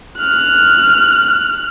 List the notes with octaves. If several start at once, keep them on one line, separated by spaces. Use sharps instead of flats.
F6 F#6